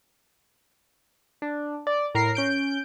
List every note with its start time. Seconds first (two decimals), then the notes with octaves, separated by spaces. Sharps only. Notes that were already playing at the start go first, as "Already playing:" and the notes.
1.42 D4
1.87 D5
2.15 A2 A#4 A#5 C7
2.35 C#4 G6 D7